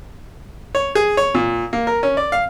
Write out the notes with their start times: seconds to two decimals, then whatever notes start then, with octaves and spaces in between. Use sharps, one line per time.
0.75 C#5
0.95 G#4
1.17 C#5
1.35 A#2
1.73 A#3
1.87 A#4
2.03 C#4
2.17 D5
2.32 F5